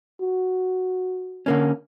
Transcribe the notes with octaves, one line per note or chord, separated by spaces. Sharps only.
F#4
D3 A#3 C#4